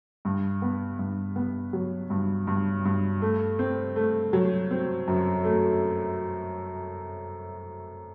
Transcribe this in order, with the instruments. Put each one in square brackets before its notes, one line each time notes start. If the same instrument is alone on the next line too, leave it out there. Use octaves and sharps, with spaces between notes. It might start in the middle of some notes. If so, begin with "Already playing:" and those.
[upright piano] G2
B3
G2
B3
F#3
G2
G2
G2
A3
C4
A3
F#3
C4
F#2
A3